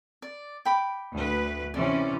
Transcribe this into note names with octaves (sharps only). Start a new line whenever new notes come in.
D5
G5 B5 D6
D2 B4
C3 E3 C#4 D5